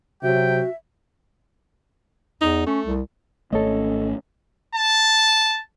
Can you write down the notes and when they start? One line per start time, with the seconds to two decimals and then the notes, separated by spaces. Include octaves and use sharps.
0.23 C3 F#3 F#4 E5 G5
2.41 E2 D#4
2.67 A3 C#4
2.85 C2
3.52 G#1 A3 C#4 A4 C#5 D#5
4.75 A5